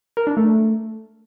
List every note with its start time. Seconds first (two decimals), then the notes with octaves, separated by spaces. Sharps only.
0.17 A#4
0.27 D4
0.37 A3